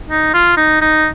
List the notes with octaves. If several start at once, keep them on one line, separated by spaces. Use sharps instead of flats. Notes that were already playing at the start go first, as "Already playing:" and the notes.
D#4
F4
D#4
D#4